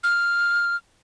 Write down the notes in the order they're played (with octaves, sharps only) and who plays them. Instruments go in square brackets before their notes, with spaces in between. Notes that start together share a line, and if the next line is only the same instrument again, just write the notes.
[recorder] F6